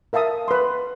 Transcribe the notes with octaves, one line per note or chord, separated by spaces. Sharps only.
A#4 E5 F5 A5 D#6
B4 C6